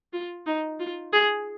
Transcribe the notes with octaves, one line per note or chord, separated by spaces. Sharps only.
F4
D#4
F4
G#4